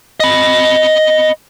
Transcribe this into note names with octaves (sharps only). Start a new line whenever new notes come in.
D#5 B5